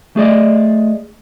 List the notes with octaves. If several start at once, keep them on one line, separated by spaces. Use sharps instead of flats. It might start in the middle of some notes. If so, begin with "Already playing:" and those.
A3 G#4 D5 D#5